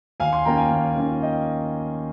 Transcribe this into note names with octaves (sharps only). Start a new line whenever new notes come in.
D#2 F5 G#5
G#5 C6
D#3 A#3 C#4 F4 G5 A#5
F5 G#5
D#2
D#3 A#3 C#4 F4
D#5 G5